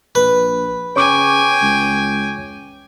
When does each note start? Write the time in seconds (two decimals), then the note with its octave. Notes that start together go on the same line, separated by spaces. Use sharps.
0.15 A#1 B4
0.96 C#3 C#5 G5 G#5 C#6 D6
1.62 C#2